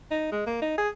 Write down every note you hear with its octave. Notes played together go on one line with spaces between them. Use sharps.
D#4
G#3
A#3
D#4
G#4